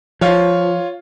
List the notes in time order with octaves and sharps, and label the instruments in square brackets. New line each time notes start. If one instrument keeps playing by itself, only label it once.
[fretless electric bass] F3 [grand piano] F4 C#5